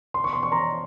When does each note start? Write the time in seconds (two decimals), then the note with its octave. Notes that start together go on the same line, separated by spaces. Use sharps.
0.14 C6
0.24 C#6
0.33 C6
0.43 C#6
0.52 A#5 C6